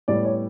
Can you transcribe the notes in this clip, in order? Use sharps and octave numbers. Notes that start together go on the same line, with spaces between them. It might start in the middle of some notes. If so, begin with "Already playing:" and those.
A2 G3 B3 D5
C#5